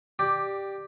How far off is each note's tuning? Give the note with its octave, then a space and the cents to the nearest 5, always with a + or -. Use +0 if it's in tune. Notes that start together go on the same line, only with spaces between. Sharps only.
G4 +0 D5 +15